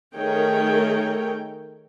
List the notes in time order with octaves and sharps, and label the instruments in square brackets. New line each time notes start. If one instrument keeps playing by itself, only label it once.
[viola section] D#3 A3 G#4 A#4 C#5 G5